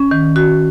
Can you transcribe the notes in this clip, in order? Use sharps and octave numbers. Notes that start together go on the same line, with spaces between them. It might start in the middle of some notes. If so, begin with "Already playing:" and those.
Already playing: C#4
D#3
F#4